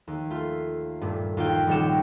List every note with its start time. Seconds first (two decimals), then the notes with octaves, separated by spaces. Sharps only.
0.07 D#2
0.30 A3 F4
1.01 G2 A#2 A3
1.37 D#2 F4 G5
1.67 D#1 D#2 G3 C#5 G5 E7